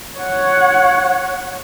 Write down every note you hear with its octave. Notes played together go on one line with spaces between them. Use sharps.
C#5 F#5